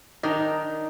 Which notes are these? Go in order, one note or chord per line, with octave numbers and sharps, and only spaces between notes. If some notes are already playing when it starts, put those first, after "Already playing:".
D#3 D4 D#4